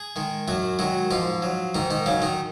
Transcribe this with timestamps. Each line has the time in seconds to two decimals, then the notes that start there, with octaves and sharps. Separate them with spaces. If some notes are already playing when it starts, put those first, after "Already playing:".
Already playing: G#4
0.16 D#3 G#3
0.48 F#2 F#3 F#4
0.79 D#3 F#3 G#3 F#4
1.11 G#2 F3 F4
1.42 F#3
1.75 G#2 D#3 D#4
1.90 D#3 D#4
2.06 C#3 F#3 C#4
2.22 D#3 D#4